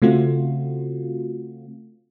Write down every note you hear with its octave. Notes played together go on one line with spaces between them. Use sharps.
C#3 A3 C4 F4 F#4